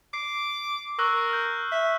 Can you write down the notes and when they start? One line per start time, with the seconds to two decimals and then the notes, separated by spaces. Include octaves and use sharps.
0.14 D6 C7
0.99 A#4 C#6 E6 F#6
1.29 F6 G6
1.72 E5